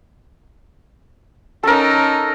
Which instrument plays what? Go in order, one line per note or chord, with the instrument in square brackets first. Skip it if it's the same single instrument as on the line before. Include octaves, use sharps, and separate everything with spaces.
[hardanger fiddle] C#4 D#4 [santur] A4 A#4